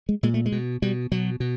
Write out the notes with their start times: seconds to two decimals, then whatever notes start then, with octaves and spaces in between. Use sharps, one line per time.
0.09 G#3
0.23 A#2 G#3
0.34 A3
0.46 G#3
0.52 B2
0.82 B2 G3
1.12 B2 F#3
1.40 B2